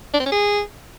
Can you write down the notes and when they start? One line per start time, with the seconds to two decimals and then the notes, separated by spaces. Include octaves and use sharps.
0.14 D4
0.20 C4
0.26 C#4
0.32 G#4